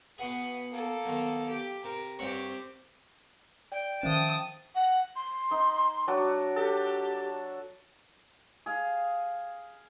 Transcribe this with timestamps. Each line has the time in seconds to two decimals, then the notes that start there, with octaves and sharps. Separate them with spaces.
0.18 B2 G#4 B4 F#5
0.71 A#3 A4
1.06 B1 D#3
1.49 G4
1.84 C3 A#4
2.19 G2 C4 G4 C#5 F#5
3.72 D5 G5
4.03 D#3 F3 C#4 C5 E5 F5 A5 D#6
4.75 F#5
5.16 C6
5.51 D#4
6.08 F#3 D4 F#4
6.56 G4 A4
8.66 G#4 F5